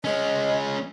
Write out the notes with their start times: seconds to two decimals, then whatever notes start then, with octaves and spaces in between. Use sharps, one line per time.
0.04 G#3 C#4 D#5